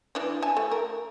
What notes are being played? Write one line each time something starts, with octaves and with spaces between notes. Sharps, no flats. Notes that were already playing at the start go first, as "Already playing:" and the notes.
E3 D4
G#5 A5
A3
A#4